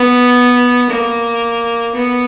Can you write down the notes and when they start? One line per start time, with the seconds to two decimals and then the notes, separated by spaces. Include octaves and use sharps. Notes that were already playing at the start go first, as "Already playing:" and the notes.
Already playing: B3
0.90 A#3
1.95 B3